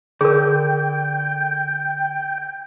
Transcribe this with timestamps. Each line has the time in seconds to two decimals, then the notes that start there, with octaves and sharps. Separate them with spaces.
0.21 D3 G#4 A#4 G5